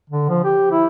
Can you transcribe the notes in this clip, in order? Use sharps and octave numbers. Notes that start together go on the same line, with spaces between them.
D3
F3
G4
E4